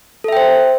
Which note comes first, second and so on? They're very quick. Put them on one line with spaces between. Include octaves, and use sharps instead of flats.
A4 E5 G5 C5